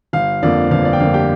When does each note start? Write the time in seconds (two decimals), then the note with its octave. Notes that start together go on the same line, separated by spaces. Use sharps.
0.13 G1 F5
0.42 F2 D3 F3 A#3 D5
0.71 G1 F5
0.85 D5
0.93 G5
1.00 F2 D3 F3 A#3 F5
1.14 G4 G5